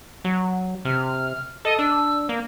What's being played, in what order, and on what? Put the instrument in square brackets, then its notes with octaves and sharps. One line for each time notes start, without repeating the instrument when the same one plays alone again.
[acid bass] F#3
[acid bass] C3 [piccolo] F6
[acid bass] A4 [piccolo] D#5
[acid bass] D4 [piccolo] E6
[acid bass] A#3